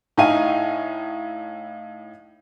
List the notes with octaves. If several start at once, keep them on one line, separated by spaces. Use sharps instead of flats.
A2 D#4 E4 F5 G#5 D#7